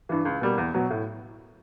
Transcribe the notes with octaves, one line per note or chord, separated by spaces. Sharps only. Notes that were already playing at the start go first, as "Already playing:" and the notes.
G2 E3
C#2
B2 G3 A#3
E2
B2 F#3
A2